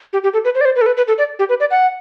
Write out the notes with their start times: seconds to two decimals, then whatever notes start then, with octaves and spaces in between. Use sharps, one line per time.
0.13 G4
0.24 G4
0.33 A4
0.45 B4
0.55 C5
0.61 D5
0.65 C5
0.76 B4
0.81 A4
0.86 B4
0.97 B4
1.08 A4
1.18 D5
1.39 G4
1.49 B4
1.60 D5
1.71 F#5